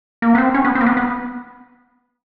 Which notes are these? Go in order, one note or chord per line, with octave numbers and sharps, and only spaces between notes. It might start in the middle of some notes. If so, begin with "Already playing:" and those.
A#3
B3
C4
C#4
B3
C4
A#3
B3
B3